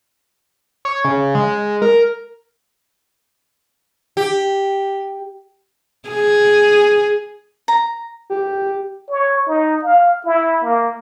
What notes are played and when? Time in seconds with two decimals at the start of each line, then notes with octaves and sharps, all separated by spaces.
0.85 C#5
1.05 C#3
1.35 G#3
1.82 A#4
4.17 G4
6.08 G#4
7.68 A#5
8.30 G4
9.10 C#5
9.47 D#4
9.84 F5
10.25 E4
10.63 A#3